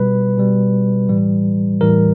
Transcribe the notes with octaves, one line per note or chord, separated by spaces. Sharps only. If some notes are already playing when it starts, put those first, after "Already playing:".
Already playing: B2 G3 B4
B2 G3
A2 E3 G3
A2 E3 G3 A#4